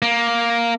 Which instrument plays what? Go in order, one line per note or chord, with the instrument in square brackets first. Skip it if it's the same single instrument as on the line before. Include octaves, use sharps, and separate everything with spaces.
[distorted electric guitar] A#3